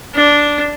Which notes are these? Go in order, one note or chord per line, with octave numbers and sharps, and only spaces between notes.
D4